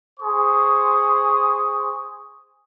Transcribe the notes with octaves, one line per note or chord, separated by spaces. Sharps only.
G#4 C5 C#6 D#6